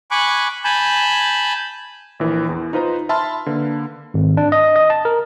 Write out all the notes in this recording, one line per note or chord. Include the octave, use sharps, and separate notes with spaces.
G#5 B5 C#6 D6 F#6
G#5 A5 B5 G6
A#1 E3 A#4
E2
D#4 F4 B4 C5 A#5
E5 A5 B5 C6 F6
D3 A#3 B4
G#1
D4
D#5
D#5
A5
A#4